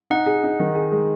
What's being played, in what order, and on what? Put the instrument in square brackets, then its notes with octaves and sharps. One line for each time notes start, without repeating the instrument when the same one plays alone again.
[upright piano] D#4 [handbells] F#5
[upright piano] G#4
D#4
D#3
G#4
G#3